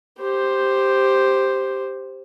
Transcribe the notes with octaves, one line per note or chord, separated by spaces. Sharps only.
G4 C5